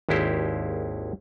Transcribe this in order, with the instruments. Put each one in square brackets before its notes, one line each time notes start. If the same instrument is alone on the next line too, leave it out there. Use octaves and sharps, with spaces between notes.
[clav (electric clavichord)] G#1 D#2 G#3 E4 G4 C5